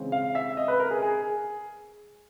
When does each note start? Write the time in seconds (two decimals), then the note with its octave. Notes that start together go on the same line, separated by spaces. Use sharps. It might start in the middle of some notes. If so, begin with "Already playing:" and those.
Already playing: C#3 E3 G#3 C4
0.12 F5
0.35 E5
0.57 D#5
0.68 B4
0.80 A#4
0.91 G#4
1.02 G#4